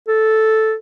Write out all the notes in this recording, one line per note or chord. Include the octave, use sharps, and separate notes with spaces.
A4